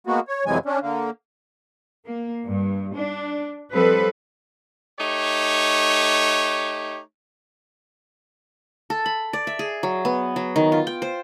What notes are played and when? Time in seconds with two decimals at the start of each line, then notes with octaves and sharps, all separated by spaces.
0.07 G#3 A#3 B3 F#4
0.28 C#5
0.46 F2 C3 E3 F#3 G#3 G#5
0.66 C#4 D4
0.81 D3 A#3
2.05 A#3
2.45 G2
2.94 D4
3.71 F3 G3 C4 A4 B4
5.00 A3 D#4 G4 C#5
8.90 A4
9.06 B5
9.33 D5
9.47 E5
9.59 G#4
9.83 F#3
10.05 B3
10.36 F#3
10.56 D#3
10.72 F4
10.87 G5
11.02 C5